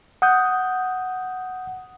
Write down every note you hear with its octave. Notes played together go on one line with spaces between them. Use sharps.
F#5 D#6 G6